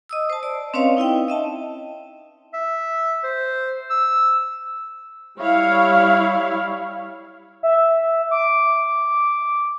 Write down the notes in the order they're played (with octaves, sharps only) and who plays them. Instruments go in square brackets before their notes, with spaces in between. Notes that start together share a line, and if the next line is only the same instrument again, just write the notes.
[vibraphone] D#5 D#6 E6
C5 A5
D5
C4 C#4 B4 C#5 D#5 F5
D#4 E4 D#5 G5
D#5 E5 A5
[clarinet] E5
C5
E6
[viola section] G3 E4 C#5 F5
[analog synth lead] E5
D6